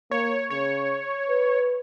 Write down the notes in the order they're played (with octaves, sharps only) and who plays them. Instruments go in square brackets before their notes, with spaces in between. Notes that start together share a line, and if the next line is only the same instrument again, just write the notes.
[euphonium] A#3 [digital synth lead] C#5
[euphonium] C#3 [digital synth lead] C#5
[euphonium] B4